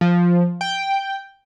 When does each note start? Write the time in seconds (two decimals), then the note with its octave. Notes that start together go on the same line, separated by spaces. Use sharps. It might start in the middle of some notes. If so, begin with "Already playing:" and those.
0.01 F3
0.61 G5